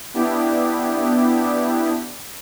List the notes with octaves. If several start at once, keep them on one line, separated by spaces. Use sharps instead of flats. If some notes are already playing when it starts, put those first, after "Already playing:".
B3 D4 E4 G4